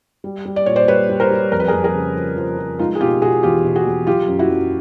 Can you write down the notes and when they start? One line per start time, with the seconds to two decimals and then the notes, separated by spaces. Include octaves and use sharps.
0.24 G3
0.45 G3
0.56 D5
0.66 A#2 C#5
0.76 C5 D5
0.88 G3 B4 C#5
1.10 G3
1.20 A#4 C5
1.31 G3
1.52 F2 A#4
1.60 B4
1.68 G#4 A#4
1.73 F2
1.84 G#4 A#4
1.95 C#3
2.16 F3
2.37 F3
2.58 F3
2.79 G#3 D#4 F4
2.95 G#4
3.01 B2 F4 G4
3.22 B2 F#4 G#4
3.43 E2 F4 G4
3.64 B2
3.76 F#4 G#4
3.86 E2
4.07 F#3 F4 G4
4.28 F#2
4.39 E4 F#4
4.50 F#2